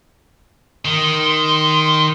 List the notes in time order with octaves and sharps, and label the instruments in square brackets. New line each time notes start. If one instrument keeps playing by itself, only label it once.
[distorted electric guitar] D#3 [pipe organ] C6